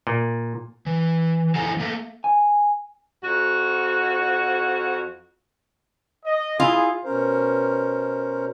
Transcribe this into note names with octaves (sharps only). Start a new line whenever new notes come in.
A#2
E3
F2 E3 G#4 A4 G#5 A#5
A3 A#3
G#5
F2 F#4
D#5
E4 F4 G#4
B2 C#4 A#4 C5